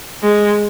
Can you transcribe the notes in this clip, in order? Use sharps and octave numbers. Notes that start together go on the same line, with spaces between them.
G#3